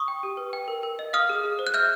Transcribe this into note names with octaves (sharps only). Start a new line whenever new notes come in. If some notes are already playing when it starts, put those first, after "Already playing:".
Already playing: C#6 D#6
G5
G4
B4
G5
A#4
A#4
D#5
F5 D#6 F6
G#4
G#4
C5
F#6
E5 F6 G6